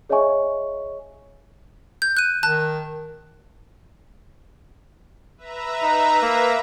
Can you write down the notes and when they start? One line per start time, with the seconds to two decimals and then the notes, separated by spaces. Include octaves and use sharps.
0.09 G#4 C#5 D#5 E5 G#5 C#6
2.02 G6
2.17 F#6 D#7
2.43 D#3 A5 F#6
5.37 B4 E5 A#5
5.83 D#4
6.22 A#3